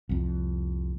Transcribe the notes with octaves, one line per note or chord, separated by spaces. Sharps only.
C2 F2